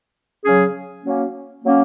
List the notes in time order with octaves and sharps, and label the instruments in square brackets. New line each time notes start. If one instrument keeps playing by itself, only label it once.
[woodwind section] C#3 F#3 C#4 G#4
F#3 A#3 C#4
F#3 A#3 C#4